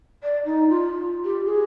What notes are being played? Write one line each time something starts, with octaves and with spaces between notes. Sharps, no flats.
D5
D#4
F4
G4
G#4